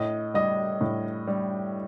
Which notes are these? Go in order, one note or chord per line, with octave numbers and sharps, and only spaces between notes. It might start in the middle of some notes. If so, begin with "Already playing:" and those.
Already playing: A2 D#5
G3 D#5
A2
G3